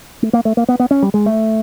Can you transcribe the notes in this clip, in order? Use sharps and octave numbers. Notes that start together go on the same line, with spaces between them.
A3
A#3
A3
A#3
B3
B3
C#4
G3
G#3
A3